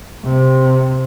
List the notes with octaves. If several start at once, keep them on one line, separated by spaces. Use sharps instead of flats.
C3